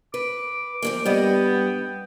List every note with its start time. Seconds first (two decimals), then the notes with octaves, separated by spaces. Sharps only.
0.14 B4 D6
0.82 F3 F#3 A#3
1.06 G2 G3 B3 D#5 G5